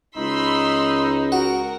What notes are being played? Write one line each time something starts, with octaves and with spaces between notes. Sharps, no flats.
C#2 D#4 B5 C6 E6
F#4 A#4 F#5